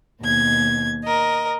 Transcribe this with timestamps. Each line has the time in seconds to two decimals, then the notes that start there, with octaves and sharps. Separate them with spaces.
0.21 D#2 B2 G#6
1.03 A#4 D#5